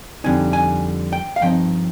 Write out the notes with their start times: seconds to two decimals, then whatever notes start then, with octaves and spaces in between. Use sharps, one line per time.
0.24 F2 D3 G3 C4 D#4 G#5
0.53 G#5
1.13 G5
1.36 F5
1.41 G2 F3 C4 D#4 G5